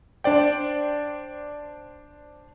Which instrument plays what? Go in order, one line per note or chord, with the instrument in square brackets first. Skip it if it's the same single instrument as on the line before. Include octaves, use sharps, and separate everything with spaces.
[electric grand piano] D4 C5 D5 G5